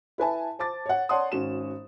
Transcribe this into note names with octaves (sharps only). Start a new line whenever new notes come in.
E4 B4 G#5 A5
C5 A5 D6 A6
C#5 F#5
C#5 D5 F#5 A5 C6 D#6
G#1 C#4 F#4 E7